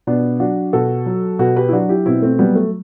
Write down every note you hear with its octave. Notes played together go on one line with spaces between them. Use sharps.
B2 B3 D4
F#3 D4 F#4
B2 F#4 A4
F#3
B2 F#4 A4
G4 B4
E4
F#3 D4 F#4
E4 G4
B2 C4 E4
A3 C4
F#3 G3 B3
A3